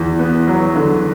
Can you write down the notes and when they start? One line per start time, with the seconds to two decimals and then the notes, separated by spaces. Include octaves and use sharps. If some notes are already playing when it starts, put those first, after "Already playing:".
Already playing: E2
0.19 B3
0.47 F#3
0.75 D3